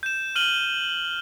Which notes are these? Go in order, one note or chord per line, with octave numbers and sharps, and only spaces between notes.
G6 E7
F6 D#7 F#7 G7